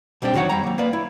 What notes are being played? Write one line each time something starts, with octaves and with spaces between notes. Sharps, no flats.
B1 G3 C4 D4 G4
D2 D#3 F#3 F#4 C#5 F#5
F2 G3 A#5
F#3 A#3
A#3 B3 D5
E4